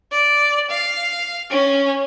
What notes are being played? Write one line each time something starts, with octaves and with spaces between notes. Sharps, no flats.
D5
F5
C#4